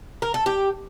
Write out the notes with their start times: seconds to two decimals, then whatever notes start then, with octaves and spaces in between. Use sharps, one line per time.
0.22 A#4
0.34 A4
0.46 G4